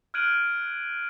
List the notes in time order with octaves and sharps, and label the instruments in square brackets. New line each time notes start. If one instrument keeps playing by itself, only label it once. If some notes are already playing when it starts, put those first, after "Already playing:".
[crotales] F6 F#6 G#6 D7 D#7 F#7